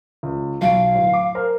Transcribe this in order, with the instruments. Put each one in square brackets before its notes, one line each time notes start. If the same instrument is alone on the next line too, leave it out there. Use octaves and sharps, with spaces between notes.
[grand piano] C#2
[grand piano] B1 D7 [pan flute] F5
[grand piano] D1
D6
A#4 C5